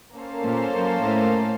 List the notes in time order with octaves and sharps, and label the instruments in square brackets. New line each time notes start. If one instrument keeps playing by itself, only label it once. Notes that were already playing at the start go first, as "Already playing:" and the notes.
[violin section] A#3 C#4 A4 C5 F5
[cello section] A#2
F#2
A2